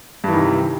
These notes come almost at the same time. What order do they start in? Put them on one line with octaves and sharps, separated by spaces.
G2 E3 D#3 C3